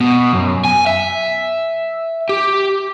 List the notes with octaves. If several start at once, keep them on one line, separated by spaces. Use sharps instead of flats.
B2
F#2
G#5
E5
G4